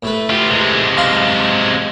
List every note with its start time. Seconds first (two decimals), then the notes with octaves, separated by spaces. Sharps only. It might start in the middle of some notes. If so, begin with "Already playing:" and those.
0.03 A2 A3 B4
0.30 F4 G4
0.50 C3 G#3
0.97 F5 A5 C6